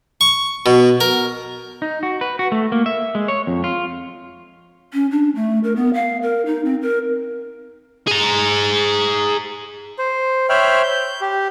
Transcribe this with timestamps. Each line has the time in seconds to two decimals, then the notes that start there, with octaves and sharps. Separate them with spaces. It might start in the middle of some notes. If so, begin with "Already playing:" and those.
0.21 C#6
0.66 B2
1.01 A#4
1.82 D#4
2.03 F#4
2.21 B4
2.39 F#4
2.52 A3
2.72 A#3
2.86 E5
3.15 G#3
3.28 C#5
3.47 F2
3.64 F4
4.94 C#4
5.11 D4
5.35 A3
5.64 A#4
5.76 B3
5.94 F5
6.22 A#4
6.46 D#4
6.65 C4
6.82 A#4
8.07 G#4 A#5
9.99 C5
10.49 C5 C#5 E5 G5 B5 F6
10.83 G6
11.21 G4